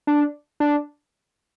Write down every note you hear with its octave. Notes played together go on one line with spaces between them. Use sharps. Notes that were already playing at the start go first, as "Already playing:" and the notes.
D4
D4